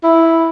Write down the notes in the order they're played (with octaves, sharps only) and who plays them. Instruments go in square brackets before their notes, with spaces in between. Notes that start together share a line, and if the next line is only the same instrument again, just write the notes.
[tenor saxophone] E4